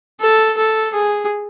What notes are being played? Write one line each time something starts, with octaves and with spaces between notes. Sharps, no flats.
A4
A4
G#4